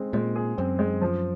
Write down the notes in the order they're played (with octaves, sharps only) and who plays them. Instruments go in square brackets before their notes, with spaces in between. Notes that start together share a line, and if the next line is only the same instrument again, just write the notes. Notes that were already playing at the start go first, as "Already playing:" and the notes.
Already playing: [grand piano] G#3 C4
[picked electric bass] A#2 [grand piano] G#3
[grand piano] G#4
[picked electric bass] F#2 [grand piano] C4
[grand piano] G#3
F3